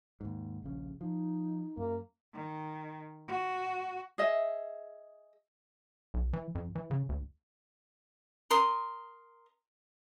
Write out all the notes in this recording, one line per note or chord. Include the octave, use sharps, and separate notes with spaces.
D#2 G#2
D#1 A#1 C#3
F3 D#4
F#2 A#3
D#3
F#4
G#4 D#5 E5
B1
E3
F2
E3
C#3
D2
A#4 C6 D#6